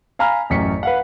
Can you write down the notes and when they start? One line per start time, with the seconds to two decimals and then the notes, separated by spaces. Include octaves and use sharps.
0.19 F5 G#5 A#5 B5 F6
0.50 A1 F#2 B6 C#7
0.83 B4 F5 F#5